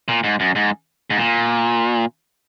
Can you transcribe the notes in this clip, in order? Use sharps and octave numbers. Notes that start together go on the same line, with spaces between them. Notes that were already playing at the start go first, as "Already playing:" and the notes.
A#2
G#2
F#2
G#2
G#2
A#2